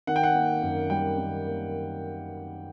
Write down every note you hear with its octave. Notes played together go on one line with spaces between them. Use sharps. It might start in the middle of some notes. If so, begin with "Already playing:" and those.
D#3 F#5
G5
F#5
A#3
F#2
G3 G5
D#3
A#3